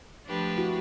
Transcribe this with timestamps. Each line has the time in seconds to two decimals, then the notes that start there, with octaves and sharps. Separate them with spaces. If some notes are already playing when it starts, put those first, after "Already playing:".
0.25 F3 A3 D4 G4 B4
0.57 E4 F#4